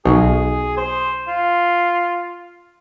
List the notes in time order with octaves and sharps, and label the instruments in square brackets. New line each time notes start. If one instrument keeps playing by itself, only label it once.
[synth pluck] B1 [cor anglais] G#4
[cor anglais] C5
F4